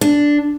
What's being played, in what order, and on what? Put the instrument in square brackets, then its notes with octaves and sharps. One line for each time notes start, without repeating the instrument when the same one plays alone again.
[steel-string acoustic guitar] D4